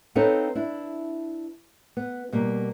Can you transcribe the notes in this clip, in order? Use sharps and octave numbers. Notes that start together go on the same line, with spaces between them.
C4 D#4 A4 B4 C#5 F5
D4 E4
B3
B2 G3 A#3